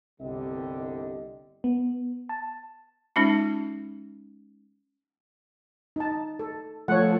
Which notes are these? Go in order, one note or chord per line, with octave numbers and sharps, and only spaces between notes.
G1 C2 D3 G3 G4 D#5
B3
A5
G#3 C#4 D#4 F4
D#4 A5
A4
F3 A3 C#5 F#5